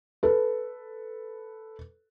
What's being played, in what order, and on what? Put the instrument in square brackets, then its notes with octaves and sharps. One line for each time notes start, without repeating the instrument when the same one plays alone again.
[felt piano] A4 B4